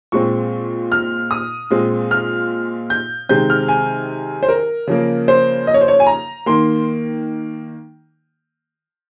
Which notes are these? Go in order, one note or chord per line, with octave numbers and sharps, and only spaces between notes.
A#2 G#3 C4 C#6
F6
D#6
A#2 G#3 C4
F6
G6
C3 D#3 G#3 C4 G6
F6
G#5
C5
A#4
C#3 F3 A#3
C5
D#5
C#5
C5
C#5
G#5
A#5
D#3 A#3 C6